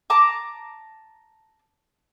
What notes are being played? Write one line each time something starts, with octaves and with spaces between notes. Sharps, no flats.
A5 A#5 D6